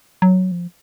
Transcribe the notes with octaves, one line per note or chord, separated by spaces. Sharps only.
F#3
F3